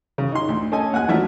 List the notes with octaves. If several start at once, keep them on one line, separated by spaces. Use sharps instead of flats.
C#3
D#4 C6
D2
C#4 A4 D#5 G#5
D#2 F#5 G#5 F#6
F3 F#3 A3 D4 E4 E5